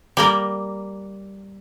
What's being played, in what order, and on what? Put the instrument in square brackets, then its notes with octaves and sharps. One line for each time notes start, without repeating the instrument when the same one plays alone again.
[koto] G3 A#3 A#4